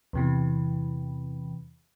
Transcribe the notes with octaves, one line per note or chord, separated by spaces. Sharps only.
E2 C3 E3